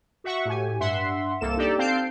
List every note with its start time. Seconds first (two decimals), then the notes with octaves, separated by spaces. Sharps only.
0.24 F#4 E5 F#5 C#6
0.45 A2 G4 G#5
0.80 G2 E5 F#5 C6
1.41 C2 A#3 A4 E7
1.57 D4 D#4 G4 A4 D5
1.78 C4 F5 A5 G6 C7 D7